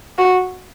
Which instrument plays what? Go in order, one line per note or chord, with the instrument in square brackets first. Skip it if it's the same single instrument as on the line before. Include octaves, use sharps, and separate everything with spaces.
[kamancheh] F#4